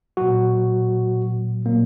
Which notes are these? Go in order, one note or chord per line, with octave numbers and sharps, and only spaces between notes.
A#2 F#3 F#4
A#2 F#3 A#3